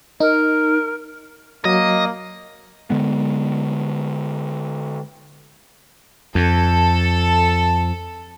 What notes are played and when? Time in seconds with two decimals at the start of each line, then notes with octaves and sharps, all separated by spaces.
0.20 D#4 A#4
1.65 F#3 A#3 D#5
2.90 D3 G#3 B3
6.35 F2 A4